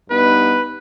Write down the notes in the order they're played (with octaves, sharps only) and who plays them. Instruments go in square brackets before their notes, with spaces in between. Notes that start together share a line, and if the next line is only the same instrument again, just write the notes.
[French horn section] G2 B3 D#4 [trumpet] B4